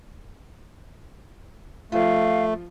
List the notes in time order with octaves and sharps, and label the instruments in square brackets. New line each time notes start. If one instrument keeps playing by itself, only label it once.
[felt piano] F3 F4 [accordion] A3 [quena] F5